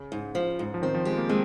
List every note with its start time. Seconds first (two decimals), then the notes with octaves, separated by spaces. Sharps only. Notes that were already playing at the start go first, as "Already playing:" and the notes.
Already playing: C#3
0.12 G#2
0.35 F3
0.59 G#2
0.74 F3
0.82 D#3 C4
0.94 F3
1.05 G#3 G4
1.18 A#3
1.29 G#3 C4